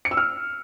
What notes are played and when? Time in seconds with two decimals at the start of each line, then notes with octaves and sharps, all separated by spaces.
0.05 C#7
0.11 E6
0.17 F6